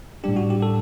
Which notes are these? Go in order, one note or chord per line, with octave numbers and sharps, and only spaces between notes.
A2 G3 D4 G4
F#4
G4
A4